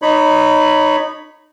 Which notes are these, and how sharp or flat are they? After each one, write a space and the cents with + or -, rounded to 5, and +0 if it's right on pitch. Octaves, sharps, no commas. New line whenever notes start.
D#4 -20 C#5 +0 B5 +0